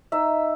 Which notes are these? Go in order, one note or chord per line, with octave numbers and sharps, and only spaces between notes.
D#4 E5